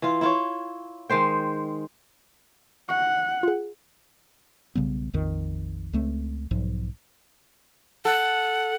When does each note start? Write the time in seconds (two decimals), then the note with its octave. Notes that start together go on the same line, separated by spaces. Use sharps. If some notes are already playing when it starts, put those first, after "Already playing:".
0.02 E3 F4
0.21 E4 F4 C#5
1.09 D#3 G#3 C5 G5
2.89 F#5 C#6 A#6 C#7
3.43 F4 G#4
4.75 B1 C#3 G3 B3
5.13 A#1 F2 D#3
5.93 C#2 A3 C4
6.51 B1 G#2 F3
8.05 A4 F#5